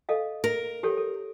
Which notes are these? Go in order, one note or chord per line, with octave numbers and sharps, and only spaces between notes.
A4 D#5 F5
A#4
G4 A4 C#5
A4